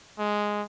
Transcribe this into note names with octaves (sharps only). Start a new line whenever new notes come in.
G#3